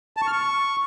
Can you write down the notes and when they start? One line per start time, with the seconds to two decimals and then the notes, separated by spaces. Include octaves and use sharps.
0.17 A5
0.22 C#6
0.27 F6
0.32 C#6